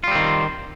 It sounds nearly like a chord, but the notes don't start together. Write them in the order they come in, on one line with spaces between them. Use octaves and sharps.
F4 G3 C4 D#3